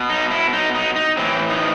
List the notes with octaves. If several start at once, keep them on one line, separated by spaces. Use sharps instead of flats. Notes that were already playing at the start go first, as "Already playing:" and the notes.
Already playing: B2
D#4
E4
D#4
D#4
D#4
A2 E3 C4
D#4